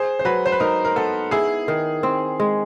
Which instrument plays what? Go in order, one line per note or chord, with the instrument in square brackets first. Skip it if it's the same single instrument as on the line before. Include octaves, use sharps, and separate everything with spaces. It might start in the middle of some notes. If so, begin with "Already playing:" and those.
Already playing: [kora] G#4 [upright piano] C5
[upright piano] C5
[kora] F#3 [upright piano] B4
[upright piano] C5
B4
[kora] D#4 [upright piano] A#4
[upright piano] A#4
[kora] B3 [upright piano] A4
[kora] E4 [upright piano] G#4
[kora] D#3
C4
G#3